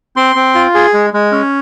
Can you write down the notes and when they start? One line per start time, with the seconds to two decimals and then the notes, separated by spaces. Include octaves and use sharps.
0.16 C4 C6
0.36 C4
0.55 F4
0.75 G#4
0.94 G#3
1.13 G#3
1.32 C#4